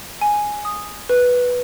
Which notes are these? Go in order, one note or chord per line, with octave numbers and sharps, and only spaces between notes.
G#5
D#6
B4